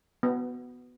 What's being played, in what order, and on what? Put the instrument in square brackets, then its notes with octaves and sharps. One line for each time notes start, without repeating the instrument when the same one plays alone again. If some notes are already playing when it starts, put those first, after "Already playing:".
[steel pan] B3